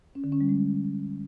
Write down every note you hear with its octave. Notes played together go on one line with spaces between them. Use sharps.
C#4
D3
C#4
G3
G#3